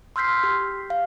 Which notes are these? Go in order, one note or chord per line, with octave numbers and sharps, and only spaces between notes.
C6 E6 F6 G6 B6 C7
G4
F5